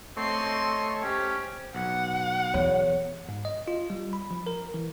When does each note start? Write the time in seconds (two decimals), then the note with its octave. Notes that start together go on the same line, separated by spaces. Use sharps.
0.17 A3 C4 C#5 D#5 C6
1.03 C#4 G4 C5
1.75 B1 F#5
2.54 E2 C#5
3.29 G#2
3.45 D#5
3.68 F4
3.90 G3
4.13 B5
4.31 F3
4.47 A#4
4.74 E3